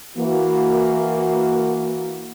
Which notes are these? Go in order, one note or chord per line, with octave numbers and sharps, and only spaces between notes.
E3 A#3 F#4